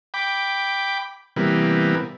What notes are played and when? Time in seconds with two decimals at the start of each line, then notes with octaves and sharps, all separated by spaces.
0.14 G5 B5 D6
1.36 C3 E3 G3 A#3 B3